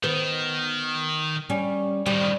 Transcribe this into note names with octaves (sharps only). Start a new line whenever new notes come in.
D#3 B3
G3 C#4
A2 D#3 G3